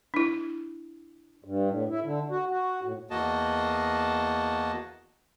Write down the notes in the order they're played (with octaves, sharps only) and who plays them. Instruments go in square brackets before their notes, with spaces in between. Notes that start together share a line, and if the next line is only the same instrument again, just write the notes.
[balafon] D4 E4
[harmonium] G2
A2
E4
D3
F#4
F#4
A2
[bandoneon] E2 A#3 F#4 D#5 A5